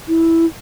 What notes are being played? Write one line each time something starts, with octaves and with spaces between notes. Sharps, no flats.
E4